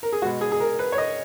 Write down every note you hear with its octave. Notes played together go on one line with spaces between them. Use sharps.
A#4
G#4
B2 G#3 F#4
G#4
G#4
A#4
B4
C#5
D#5